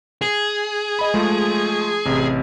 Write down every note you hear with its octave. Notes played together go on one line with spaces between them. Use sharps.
G#4
D#5 B5
F3 G#3 A3
A1 C3